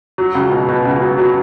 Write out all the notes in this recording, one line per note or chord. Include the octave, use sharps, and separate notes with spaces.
F#3
C#2
B2
B2
C#2
F#3
F#3